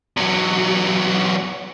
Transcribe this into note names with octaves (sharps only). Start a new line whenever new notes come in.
E2 F#3